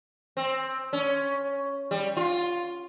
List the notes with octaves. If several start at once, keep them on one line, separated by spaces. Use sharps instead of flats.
C4
C#4
G3
F4